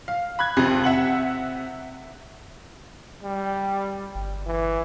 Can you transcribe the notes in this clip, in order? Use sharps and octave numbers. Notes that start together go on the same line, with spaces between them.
F5
B5 F#6 G#6
G#1 F2 C3
E5 F#5 F#7
G3
G1
E3